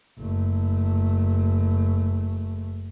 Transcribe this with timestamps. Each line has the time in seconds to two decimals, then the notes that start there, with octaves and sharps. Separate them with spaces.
0.19 F#1 A3